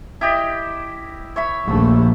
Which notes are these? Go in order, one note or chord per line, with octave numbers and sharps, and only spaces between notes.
E4 G4 D#5
C#5 E5 B5
A#1 D#2 A3